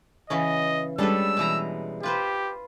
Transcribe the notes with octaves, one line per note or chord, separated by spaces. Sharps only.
C#3 E3 C#4 D#5
G3 G#3 C#4 D4 A4 B4 E6
B2 E3 A#5
F4 G4 B4 C5